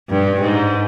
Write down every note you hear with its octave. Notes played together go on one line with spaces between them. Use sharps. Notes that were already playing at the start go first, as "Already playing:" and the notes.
G2
G#2